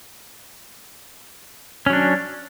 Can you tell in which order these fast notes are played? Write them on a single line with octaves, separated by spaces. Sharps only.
C#4 F#3 D4